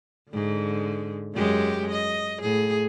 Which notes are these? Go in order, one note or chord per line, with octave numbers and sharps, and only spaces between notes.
G#2 D3
F#2 G#3 G4
D#5
A2 G#4